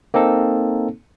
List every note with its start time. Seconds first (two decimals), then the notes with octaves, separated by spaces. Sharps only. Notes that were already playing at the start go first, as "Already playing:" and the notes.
0.14 A#3 C4 D#4 A4